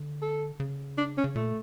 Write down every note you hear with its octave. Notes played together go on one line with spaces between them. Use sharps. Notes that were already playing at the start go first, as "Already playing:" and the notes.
Already playing: D3
A4
C#3
D4
C#4
C#3
A#2 A3